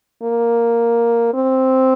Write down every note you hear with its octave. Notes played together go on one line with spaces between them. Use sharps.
A#3
C4